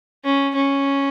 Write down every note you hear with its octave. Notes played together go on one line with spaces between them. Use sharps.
C#4
C#4